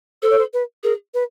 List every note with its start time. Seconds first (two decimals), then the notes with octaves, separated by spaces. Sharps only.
0.22 A4 C5
0.30 C#5
0.38 C5
0.53 B4
0.83 G#4 A#4
1.14 B4